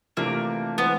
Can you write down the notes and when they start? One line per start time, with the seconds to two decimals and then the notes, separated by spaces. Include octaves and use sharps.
0.17 C3 E3 A3 A#3 D4 F4
0.77 E3 G#3 B3 C4